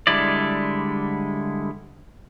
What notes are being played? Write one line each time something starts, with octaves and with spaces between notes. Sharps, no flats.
D3 G3 G#3 E4 D5